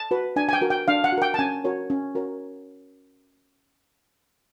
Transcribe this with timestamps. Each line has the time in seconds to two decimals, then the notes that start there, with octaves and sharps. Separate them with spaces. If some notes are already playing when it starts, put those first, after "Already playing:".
Already playing: A5
0.11 F#4 B4
0.36 D4 G#5
0.49 G#5
0.53 G5
0.61 F#4 A#4
0.70 G5
0.88 D4 F5
1.04 F#5
1.12 F#4
1.18 A#4 G5
1.34 A5
1.39 C#4 G#5
1.64 F#4 A#4 C#5
1.90 C#4
2.15 F#4 A#4 C#5